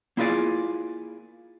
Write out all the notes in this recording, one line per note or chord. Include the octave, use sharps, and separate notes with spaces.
A#3 E4 F4 G#4 D5